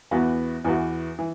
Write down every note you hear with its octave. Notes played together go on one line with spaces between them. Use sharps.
E2 E3 B3 F#4
E2 E3 B3 F#4
E3